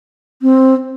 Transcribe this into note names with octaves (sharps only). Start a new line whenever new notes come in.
C4